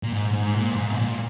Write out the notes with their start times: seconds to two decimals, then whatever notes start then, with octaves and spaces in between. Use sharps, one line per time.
0.03 A#2
0.12 G#2
0.33 G#2
0.55 A#2
0.71 G2
0.77 G#2
0.91 B2
0.99 A#2